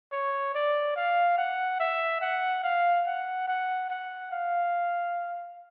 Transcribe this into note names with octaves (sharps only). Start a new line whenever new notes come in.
C#5
D5
F5
F#5
E5
F#5
F5
F#5
F#5
F#5
F5